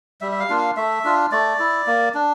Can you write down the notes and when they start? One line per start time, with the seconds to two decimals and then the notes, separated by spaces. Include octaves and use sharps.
0.21 G3 E5
0.32 E5
0.40 F5
0.49 A#3 D4 F4
0.58 F5
0.77 A3 E5
1.04 D4 F4
1.32 A3 D5
1.59 E4
1.87 A#3
2.14 D4